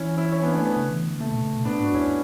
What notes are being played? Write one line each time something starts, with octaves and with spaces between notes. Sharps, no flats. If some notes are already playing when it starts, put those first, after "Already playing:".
Already playing: E3 C#4 E4
C#4 E4
C#4 E4
B3 D4
A3 C#4
B3
C#3
E3
D3
C#3 A3
B2
C#3
B2
A2 B3 D4
G#2 D4 F#4
E2 C#4 E4